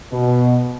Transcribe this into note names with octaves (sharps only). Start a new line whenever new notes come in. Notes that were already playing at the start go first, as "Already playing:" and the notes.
B2